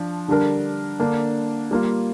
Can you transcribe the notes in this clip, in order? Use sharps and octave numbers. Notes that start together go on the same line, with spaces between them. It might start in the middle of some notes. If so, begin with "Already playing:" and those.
Already playing: F3 D4
D3 G3 D4 A#4
D3 A#3 D4
G3 A#3 F4